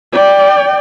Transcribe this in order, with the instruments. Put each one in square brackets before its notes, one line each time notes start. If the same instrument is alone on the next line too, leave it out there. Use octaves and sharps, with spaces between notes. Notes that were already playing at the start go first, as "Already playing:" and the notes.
[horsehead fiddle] D5 G5